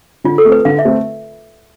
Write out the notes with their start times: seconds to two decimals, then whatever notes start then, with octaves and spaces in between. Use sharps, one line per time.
0.24 D3 F4
0.38 A4
0.45 A3 C4
0.52 B4
0.65 D3 F5
0.79 E5
0.85 A3 C4